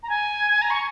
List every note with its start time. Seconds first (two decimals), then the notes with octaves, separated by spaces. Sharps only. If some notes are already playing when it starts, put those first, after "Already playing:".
0.03 A#5
0.09 G#5
0.62 A#5
0.70 C#6